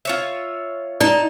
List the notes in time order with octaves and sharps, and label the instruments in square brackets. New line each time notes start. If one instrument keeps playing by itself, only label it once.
[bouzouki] F4 C#5 E5
[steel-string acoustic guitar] D#4 A5 [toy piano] D5